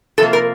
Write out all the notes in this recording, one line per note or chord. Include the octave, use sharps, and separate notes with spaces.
C3 F3 A#3 A4
A#4